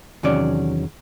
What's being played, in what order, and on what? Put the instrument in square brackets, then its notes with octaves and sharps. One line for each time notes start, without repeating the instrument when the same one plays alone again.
[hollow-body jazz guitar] E2 C3 D#3 F#3 C#4 D5